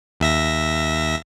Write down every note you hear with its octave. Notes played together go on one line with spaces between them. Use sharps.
D#2 E5 A#6